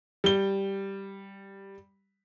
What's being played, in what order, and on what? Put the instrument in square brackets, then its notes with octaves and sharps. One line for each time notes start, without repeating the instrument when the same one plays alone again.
[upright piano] G3 G7